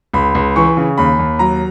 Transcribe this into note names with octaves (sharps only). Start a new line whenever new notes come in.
C#2 B5
C#2
E3 C#6
C#3
D#2 B5
D#2
F#3 A#5